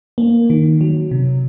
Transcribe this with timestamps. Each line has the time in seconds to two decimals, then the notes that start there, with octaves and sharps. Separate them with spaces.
0.18 A#3
0.50 D#3
0.81 F#3
1.11 C3